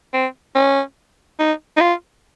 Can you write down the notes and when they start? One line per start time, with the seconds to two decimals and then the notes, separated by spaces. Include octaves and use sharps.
0.14 C4
0.55 C#4
1.39 D#4
1.77 D#4
1.80 F4